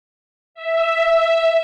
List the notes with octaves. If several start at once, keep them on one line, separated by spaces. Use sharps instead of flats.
E5